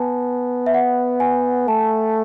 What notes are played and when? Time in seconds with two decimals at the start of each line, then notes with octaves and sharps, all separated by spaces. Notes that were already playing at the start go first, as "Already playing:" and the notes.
Already playing: B3 G#5 A5
0.66 E5
0.74 F#5
1.20 G#5
1.68 A3 A5